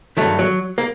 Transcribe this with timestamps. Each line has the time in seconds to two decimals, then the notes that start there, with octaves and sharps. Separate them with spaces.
0.17 G2 D#3 F#3 A3
0.39 F#3
0.78 A#3